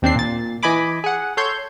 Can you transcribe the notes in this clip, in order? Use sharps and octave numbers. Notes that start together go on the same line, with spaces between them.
D#2 C4 D4 C7
A#2 A6
E3 D#5 G#5 B5 D6
G#4 F#5
A4 C#5 C6 G6